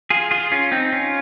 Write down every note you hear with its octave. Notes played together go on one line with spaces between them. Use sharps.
F4 G#4
F4 G#4
C#4 F4
C4 D#4
C#4 F4